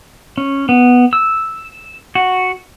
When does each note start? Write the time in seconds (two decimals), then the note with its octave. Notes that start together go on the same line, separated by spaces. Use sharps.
0.38 C#4
0.69 B3
1.13 E6
2.15 F#4